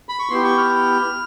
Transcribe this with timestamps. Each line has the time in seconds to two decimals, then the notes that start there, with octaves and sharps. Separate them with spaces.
0.09 B5
0.19 C#6
0.30 B3 E4 G4 C6
0.44 C#6
0.58 F6